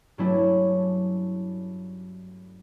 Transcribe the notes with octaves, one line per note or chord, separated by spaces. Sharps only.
G2 F#3 A3 C#4 D4 E4